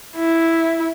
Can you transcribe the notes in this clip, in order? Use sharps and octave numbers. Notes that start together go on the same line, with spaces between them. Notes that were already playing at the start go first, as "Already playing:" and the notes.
E4